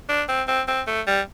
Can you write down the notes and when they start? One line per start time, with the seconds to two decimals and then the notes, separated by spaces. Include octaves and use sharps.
0.09 D4
0.29 C4
0.48 C4
0.68 C4
0.87 A3
1.07 G3